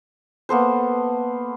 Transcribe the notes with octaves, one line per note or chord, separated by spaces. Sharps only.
A#3 B3 A4 C5